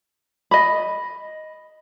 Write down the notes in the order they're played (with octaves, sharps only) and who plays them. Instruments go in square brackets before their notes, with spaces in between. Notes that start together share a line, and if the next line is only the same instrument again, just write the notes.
[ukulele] D#5 B5